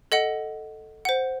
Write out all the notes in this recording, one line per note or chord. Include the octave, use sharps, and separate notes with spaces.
A4 D#5 F#5
C5 F#5